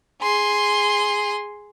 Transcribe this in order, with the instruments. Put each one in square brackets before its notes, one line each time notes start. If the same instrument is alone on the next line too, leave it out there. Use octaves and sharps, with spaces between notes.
[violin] G#4 C6